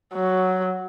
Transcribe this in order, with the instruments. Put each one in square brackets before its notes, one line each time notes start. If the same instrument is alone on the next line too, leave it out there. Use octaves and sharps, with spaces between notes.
[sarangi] F#3